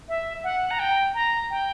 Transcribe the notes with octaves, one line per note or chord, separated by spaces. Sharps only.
E5
F#5
A#5
G5
A#5
G5